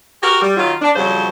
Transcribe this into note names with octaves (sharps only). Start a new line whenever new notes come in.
F#4 G4 A#4
G3
D#3 F#3 F4
D4
F2 C#3 F#3 G3 C5